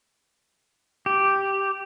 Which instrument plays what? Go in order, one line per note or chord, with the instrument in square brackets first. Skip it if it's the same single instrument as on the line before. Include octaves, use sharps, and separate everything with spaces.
[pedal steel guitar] G4